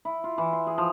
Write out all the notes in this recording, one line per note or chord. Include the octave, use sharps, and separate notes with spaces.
E4
F4
E3
C6
G#4
F3